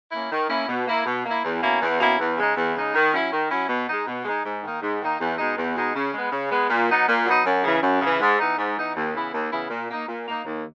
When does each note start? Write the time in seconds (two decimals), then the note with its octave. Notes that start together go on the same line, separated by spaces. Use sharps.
0.12 A#3 C#4 E4
0.31 D#3
0.50 A#3 C#4 E4
0.68 B2
0.87 A#3 E4
1.06 B2
1.26 A#3 E4
1.44 E2
1.62 B2 A#3 C#4 E4
1.82 E2
2.00 B2 A#3 C#4 E4
2.19 E2
2.38 C#3 G#3 D#4
2.56 E2
2.75 C#3 G#3 D#4
2.94 D#3
3.13 F#3 C#4 E4
3.32 D#3
3.51 F#3 C#4 E4
3.69 B2
3.88 G#3 D#4
4.07 B2
4.25 G#3 D#4
4.44 G#2
4.64 D#3 A#3 D#4
4.82 G#2
5.01 D#3 A#3 D#4
5.20 E2
5.38 B2 G#3 D#4
5.57 E2
5.76 B2 G#3 D#4
5.95 C#3
6.13 G#3 B3
6.32 C#3
6.51 G#3 B3
6.70 A#2
6.89 F#3 B3 D#4
7.08 A#2
7.26 F#3 B3 D#4
7.45 F#2
7.63 C#3 E3
7.82 F#2
8.01 C#3 E3
8.20 G#2
8.39 E3 B3 D#4
8.58 G#2
8.77 E3 B3 D#4
8.96 D#2
9.14 C#3 E3 B3 E4
9.33 D#2
9.52 C#3 E3 B3 E4
9.70 A#2
9.90 A#3 D#4
10.08 A#2
10.27 A#3 D#4
10.45 D#2